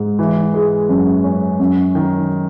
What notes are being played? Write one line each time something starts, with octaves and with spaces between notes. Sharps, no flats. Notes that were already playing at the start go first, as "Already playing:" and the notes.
Already playing: G#2
E3
G#3
F#2
C#4
F#2
D#3